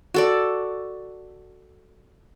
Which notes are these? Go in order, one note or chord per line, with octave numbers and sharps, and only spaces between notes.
F#4 A4 D5